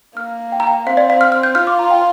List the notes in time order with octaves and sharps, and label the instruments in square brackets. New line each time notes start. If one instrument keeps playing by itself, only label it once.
[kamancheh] A#3 [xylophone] F6
[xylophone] G5
A#5
G5
[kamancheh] C4 [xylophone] F5
[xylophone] D5
F5
F6
F6
G6
[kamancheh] F4 [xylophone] F6
[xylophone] D6
A#5
G5